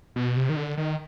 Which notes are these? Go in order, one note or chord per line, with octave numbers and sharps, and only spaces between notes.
B2
C3
D#3
D3
D#3